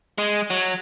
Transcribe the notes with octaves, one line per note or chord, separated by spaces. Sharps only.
G#3
F#3